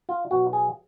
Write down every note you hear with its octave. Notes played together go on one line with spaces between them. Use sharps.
F4
B2 F#3 F#4
G#4